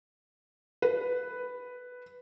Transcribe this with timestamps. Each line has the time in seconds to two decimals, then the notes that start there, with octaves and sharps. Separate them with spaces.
0.82 B4